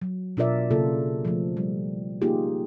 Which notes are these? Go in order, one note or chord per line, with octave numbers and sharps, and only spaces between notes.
F#3
B2 D4 F4 A#4 D5 E5
C#3 A#3 F4 A4
F3 A3
G3
A#3 D#4 F4 G4 G#4